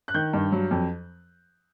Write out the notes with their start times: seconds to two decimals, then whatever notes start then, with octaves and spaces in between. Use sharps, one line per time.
0.08 F#6
0.14 D#3 G6
0.33 G2
0.52 F#3
0.71 F2